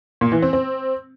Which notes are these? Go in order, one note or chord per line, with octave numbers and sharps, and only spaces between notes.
A#2
E3
C4
C4